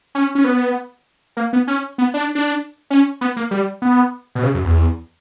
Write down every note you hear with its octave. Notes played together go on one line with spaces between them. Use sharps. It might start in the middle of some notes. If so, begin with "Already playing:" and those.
C#4
C#4
B3
A#3
B3
C#4
B3
D4
D4
C#4
B3
A#3
G3
B3
B2
C#3
F#2
E2